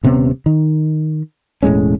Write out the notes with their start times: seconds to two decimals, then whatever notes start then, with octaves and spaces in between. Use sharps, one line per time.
0.03 D#1 C3 B3 C#4
0.46 D#3
1.63 E1 A2 G#3 C#4